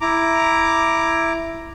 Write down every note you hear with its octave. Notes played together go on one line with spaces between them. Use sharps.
E4 A#5 D6